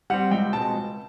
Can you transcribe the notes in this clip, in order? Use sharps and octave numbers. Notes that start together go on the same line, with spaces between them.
G3 C4 F#5
C#2 G5
B2 G#3 C4 A5
C#2